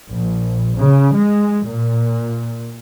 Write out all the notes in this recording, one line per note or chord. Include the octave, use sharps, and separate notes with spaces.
A#1
C#3
G#3
A#2